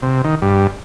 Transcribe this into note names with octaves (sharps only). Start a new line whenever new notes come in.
C3
D#3
G2